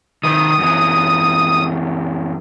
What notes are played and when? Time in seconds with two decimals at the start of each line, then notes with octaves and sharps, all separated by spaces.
0.23 D#3 B4 D#6
0.58 F#2 E3